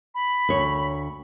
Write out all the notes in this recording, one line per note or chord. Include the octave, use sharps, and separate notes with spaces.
B5
D2 C#5